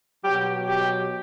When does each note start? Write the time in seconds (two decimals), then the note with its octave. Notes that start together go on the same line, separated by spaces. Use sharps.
0.25 B2 F#3 G4
0.65 G4